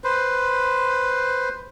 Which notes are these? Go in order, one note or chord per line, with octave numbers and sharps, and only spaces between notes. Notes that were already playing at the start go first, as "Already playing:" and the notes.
B4 C5